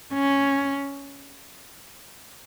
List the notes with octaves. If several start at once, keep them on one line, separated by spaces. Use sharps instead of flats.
C#4